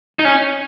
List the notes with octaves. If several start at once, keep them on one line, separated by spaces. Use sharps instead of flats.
D#4
C#4